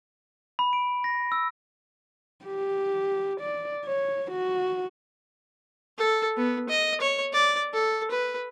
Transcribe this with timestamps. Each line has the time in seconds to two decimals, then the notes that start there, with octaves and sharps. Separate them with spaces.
0.59 B5
0.73 D7
1.04 A#6
1.32 E6
2.45 G4
3.41 D5
3.86 C#5
4.31 F#4
5.98 A4
6.37 B3
6.70 D#5
7.01 C#5
7.33 D5
7.73 A4
8.11 B4